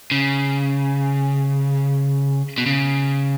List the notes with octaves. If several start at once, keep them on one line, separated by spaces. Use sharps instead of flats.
C#3
B2
C#3